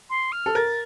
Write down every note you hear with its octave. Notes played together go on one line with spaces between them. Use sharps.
C6
F6
A4
A#4 A6